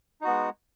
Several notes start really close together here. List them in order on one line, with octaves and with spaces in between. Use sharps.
D#4 F#4 B3 G#3